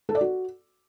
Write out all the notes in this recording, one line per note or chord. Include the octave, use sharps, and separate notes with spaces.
A4
D5
F#4